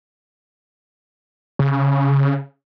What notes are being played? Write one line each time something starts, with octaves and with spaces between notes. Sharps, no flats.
C#3